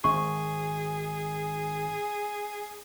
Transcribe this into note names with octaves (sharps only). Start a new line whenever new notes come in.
G#1 G#4 C#6